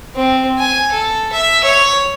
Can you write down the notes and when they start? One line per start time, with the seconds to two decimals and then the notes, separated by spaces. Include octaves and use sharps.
0.16 C4
0.59 G#5
0.92 A4
1.32 E5
1.63 C#5